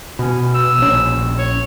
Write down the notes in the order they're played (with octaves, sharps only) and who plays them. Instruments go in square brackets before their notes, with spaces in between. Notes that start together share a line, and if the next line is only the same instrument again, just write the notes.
[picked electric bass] B2 [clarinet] C#4
[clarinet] E6
[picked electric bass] A#1 C#4
[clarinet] C#5